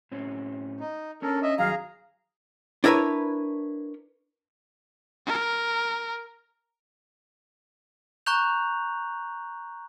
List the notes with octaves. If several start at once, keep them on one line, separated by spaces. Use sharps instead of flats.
A2 C4 C#4
D#4
C#4 D4 A4 A#4 C#5
D#5 E5
G2 D#3 F#3 G#4 F5 A#5
D4 E4 A#4 B4 C#5
A#4
A#5 C#6 F#6 G6 F7